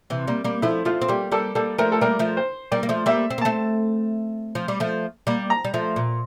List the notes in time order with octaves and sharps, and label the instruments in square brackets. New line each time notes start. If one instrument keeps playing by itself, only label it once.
[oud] C3 E3
G3 A#3
G3 A#3
[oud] F3 A3 [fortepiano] E4
[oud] F3 A3 [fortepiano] F4
[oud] C4
[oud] G3 A#3 [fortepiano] G4
[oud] G3 A#3 [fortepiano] A4
[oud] G3 A#3 [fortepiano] A4
[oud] F3 A3 [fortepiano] A#4
[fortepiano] A4
[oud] G3 A#3 [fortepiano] A#4
[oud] F3 A3
[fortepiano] C5
[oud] G3 A#3 [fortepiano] D5
[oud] A#3
F3 A3
[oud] G3 A#3 [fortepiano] E5
[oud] C4
A#3
[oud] A3 C4 [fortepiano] A5
[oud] F3
G3
F3 A3
G3 A#3
[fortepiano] A#5
[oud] G3
F3 A3
A#2